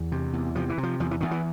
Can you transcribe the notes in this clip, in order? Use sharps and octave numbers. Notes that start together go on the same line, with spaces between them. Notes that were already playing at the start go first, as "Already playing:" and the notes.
Already playing: E2
C3
E2
C3 F3
E3
C3
F3
E2 F3
E3
E2 D#3
E3